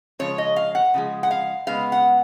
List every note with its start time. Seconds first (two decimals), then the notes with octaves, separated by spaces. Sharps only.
0.19 C#3 F3 G#3 C#5
0.38 D#5
0.56 F5
0.75 F#5
0.94 C#3 F3 G#3
1.23 F#5
1.31 F5
1.67 C#3 G#3 B3 F5
1.92 F#5